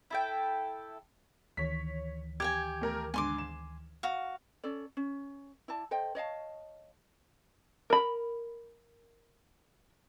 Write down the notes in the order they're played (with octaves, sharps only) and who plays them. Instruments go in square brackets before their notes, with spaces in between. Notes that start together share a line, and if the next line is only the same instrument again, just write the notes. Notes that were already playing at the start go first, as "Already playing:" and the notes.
[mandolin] E4 A4 G5
[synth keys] D2 D#3 E3 [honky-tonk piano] C#5 B6
[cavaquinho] G4 G5 G#5 [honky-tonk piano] G#6
[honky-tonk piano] A3 A#4
[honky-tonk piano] G#2 D3 [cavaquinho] G#5 C6 D6
[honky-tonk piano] E7
[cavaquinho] F#4 F5
[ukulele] C#4 A4 D5
C#4
E4 D5 A5
A4 C5 D#5 G5
C#5 D#5 F5 A5
[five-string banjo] A#4 B5